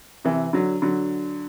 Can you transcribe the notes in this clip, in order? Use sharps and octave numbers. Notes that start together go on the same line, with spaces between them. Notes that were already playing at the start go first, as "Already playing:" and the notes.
C3 E3
D3 F#3
D3 F#3